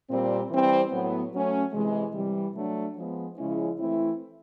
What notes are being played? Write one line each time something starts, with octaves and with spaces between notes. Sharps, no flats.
A#2 G3 C4
E3 G3 C4
A2 F#3 B3
F#3 A3 C#4
C3 E3 G#3
C3 E3 G3
F#3 A3 D4
F3 G#3 B3
C#3 F3 G#3 C#4 E4
E3 A3 C4 E4